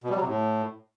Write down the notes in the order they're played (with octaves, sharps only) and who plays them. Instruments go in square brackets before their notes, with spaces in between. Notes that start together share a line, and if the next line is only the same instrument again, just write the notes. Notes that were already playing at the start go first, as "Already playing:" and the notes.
[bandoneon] B2
G3
F#3
C3
A2